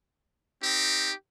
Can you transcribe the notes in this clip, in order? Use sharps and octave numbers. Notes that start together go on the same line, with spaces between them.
C4 D#4 G4